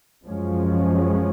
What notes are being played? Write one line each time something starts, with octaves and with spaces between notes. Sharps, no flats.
F#2 F3 G#3 C#4